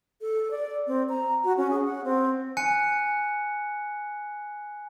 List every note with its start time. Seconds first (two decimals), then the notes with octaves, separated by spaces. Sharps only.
0.21 A4
0.51 D5
0.87 C4
1.09 A#5
1.44 F#4
1.57 C#4
1.70 G#4
1.84 F#5
2.04 C4
2.57 G#5 F#6 C#7